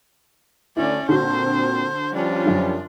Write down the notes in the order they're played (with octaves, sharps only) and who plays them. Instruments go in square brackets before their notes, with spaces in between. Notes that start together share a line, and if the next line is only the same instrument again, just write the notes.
[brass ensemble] D2 D4 [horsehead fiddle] C#4 D5 [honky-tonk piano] E4
[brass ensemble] A#2 C4 [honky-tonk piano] D3 F#4 [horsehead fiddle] C5
[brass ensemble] F3 G3 C#4 [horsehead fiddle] D4 F4
[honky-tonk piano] F#2 D3